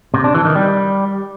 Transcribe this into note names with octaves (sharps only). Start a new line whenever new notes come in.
C3
D4
E3
D#3
G3